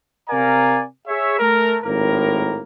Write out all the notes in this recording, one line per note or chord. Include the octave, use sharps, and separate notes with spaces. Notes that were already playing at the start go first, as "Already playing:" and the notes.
C3 A#4 D5 F5 G#5 A#5
G#4 C#5 E5
A3 A#4
G#1 A2 A#3 A#4